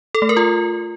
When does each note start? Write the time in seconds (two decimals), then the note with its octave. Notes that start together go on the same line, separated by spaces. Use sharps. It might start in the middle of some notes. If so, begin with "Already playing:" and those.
0.15 A4
0.22 A3
0.29 A#4
0.37 F4